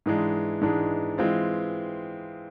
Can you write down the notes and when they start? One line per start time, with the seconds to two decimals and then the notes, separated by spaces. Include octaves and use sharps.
0.06 G#2 E3 G#3 D4
0.61 G#2 E3 G#3 D4
1.18 E3 G#3 C4 F4